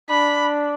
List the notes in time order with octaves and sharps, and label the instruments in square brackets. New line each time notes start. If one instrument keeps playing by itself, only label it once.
[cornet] D4 [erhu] B5